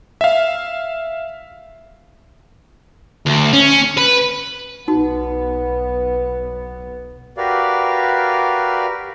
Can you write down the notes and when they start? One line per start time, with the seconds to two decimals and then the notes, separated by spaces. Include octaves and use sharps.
0.21 E5 F5
3.26 D2
3.53 C#4
3.97 B4
4.88 B1 B3 D#4 F#4
7.37 F#4 G4 A#4 B4 D5 F5